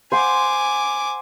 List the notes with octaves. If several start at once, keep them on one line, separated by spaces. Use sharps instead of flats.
C5 F#5 G#5 C6 D6